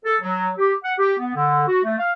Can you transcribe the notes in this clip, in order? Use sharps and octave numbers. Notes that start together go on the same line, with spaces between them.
A4
F#3
G4
F#5
G4
B3
D3
F#4
A3
F5